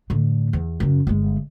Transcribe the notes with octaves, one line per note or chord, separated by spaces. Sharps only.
A2 D3
E2
F#2 C#3
G1 G#3